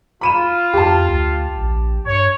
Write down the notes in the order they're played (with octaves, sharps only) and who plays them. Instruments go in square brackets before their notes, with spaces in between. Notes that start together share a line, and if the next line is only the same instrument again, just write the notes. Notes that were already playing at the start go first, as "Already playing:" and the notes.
[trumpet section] F4 [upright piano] B5 D#7 E7
[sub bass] F2 [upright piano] G4 A5
[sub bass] D2
A#1
[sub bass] G2 [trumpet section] C#5